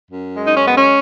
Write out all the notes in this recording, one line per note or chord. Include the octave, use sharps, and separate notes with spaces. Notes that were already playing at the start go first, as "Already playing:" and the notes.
F#2
G#3
D#4
C#4
F#2 B3
C#4